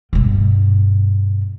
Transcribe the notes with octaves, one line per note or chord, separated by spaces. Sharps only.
G2 B2